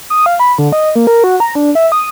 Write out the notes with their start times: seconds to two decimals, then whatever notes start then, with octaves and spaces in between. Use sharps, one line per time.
0.10 D#6
0.26 F5
0.40 B5
0.59 D3
0.72 D#5
0.96 A#3
1.07 A#4
1.24 F#4
1.40 A#5
1.55 D4
1.75 E5
1.92 D#6